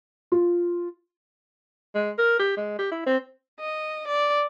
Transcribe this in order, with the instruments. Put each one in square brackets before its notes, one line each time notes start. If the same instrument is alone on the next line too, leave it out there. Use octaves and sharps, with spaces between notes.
[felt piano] F4
[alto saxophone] G#3
A#4
G4
G#3
G4
E4
C4
[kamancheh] D#5
D5